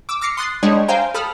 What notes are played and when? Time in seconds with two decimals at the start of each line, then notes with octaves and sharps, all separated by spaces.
0.09 D6 E6
0.21 D6 F6 A#6 C7 C#7
0.37 C6 D#6 F#6 A6 C7
0.63 G3 G#3 D4 G#4 C#5
0.88 C5 F5 G5 G#5 A#5
1.14 A4 B5 D#6 F6